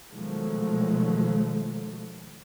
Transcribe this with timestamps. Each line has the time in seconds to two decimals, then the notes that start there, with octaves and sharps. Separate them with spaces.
0.12 B2 D#3 F3 F#3 G#3 A3